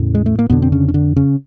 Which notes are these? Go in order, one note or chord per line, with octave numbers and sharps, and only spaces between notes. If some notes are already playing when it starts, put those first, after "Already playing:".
Already playing: E2 A2 C#3
G#3
A3
A#3
F2 B2 D3 B3
C4
C#3 C#4
C#4
D3 D4
C#3 C#4